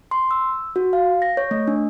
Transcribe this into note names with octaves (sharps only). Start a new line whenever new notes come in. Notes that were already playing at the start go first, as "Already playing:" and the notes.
C6
E6
F#4
F5
A#6
C#5
A3
D4